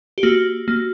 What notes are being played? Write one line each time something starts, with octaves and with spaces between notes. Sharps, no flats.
G4
A#3 F#4
A#3